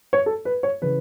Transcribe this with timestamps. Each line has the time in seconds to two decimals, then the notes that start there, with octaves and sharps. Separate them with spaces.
0.13 C#5
0.26 A4
0.45 B4
0.63 C#5
0.82 C#3 E3 B4